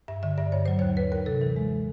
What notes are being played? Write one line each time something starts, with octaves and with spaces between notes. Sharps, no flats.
G2 E5
D3 E5
G2 D5
G2 C#5
F#3 C5
C#5
D#2
D#2 B4
D#2 A#4
C3 A4
E3
G#3